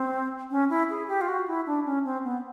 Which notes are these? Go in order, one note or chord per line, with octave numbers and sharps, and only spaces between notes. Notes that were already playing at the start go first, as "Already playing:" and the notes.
Already playing: C4
C#4
E4
G#4
G4
F4
F#4
E4
D4
C#4
C4
B3